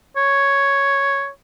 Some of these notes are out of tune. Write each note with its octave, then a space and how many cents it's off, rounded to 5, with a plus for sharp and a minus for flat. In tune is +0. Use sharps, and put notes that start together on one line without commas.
C#5 +0